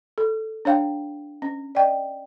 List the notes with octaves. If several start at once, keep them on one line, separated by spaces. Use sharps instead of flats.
A4
D4 C#5 F5 G5
C#4
D5 D#5 G5